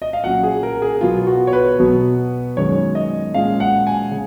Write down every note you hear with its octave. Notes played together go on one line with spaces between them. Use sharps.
D#5
F5
A#2 F#3 C#4 F#5
G#4
A#4
G#4
B2 F#3 B3 F4
F#4
C#5
B4
B2 F#3 B3
F#2 D#3 G#3 C#4 C#5
D#5
A#2 G#3 C#4 F5
F#5
G#5
C#3